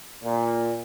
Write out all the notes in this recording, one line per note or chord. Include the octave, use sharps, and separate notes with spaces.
A#2